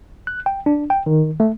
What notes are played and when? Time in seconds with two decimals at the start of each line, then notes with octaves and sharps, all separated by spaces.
0.27 F#6
0.46 G5
0.66 D4
0.90 G5
1.06 D#3
1.40 A3